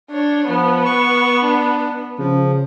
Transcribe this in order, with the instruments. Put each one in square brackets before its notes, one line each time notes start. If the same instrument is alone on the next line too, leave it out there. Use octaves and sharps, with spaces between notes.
[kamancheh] D4 C#5
[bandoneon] F3 [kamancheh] B3 B4
[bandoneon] C#6
D4
[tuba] C#3 [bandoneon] F3